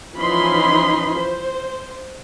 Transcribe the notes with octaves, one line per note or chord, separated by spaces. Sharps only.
E3 F3 C#4 D#4 B5 C6
C5